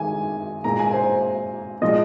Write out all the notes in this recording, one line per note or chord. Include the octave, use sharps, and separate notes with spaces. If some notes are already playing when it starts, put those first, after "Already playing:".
Already playing: D#3 G#3 G#5
A#2 G#3 A#5
G#5
C5
A#2 F3 G#3 D#5